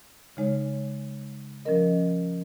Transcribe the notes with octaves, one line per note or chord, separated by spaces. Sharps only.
C#3 G#3 D#4 C#5
F3 C#4 A#4 D#5